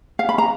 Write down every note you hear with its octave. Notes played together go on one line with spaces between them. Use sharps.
F5
B5
A#5